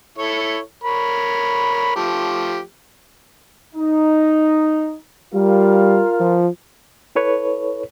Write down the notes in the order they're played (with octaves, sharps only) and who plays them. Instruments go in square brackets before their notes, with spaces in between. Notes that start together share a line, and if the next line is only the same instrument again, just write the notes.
[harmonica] E4 A4 C#5
A#4 C#5 B5
F3 A3 G4
[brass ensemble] D#4
[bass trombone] G3 [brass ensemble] F4 A#4 F5
[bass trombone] F3
[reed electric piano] E4 A4 B4 C#5